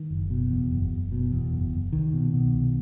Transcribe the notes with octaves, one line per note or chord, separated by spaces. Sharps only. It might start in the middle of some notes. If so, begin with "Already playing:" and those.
Already playing: D#3
F#1
B2
E2
F#1
F#1
B2
E2
F#1
F#1
C2 D#3
B2
B2
C2